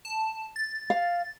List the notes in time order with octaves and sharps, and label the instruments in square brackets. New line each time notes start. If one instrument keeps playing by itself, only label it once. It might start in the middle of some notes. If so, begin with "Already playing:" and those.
[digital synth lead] A5
A6
[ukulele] F5